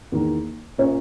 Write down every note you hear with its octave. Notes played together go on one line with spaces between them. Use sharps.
E2 D#3 A#3
A#2 A#3 C#4